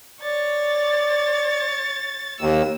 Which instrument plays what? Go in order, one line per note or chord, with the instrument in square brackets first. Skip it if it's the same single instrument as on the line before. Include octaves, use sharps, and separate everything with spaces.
[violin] C#5 A6 [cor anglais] D5
[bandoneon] D#2 [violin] E6